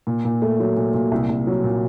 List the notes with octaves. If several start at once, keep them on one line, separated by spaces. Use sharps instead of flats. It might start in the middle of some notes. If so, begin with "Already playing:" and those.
A#2
A#2
A3
F#3
A#2
A#2
C2
C2
F#3
A#2